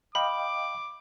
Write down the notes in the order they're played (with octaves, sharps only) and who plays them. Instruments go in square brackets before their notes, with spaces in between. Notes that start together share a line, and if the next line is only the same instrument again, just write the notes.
[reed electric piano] D#5 F5 G5 [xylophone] B5 [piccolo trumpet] D6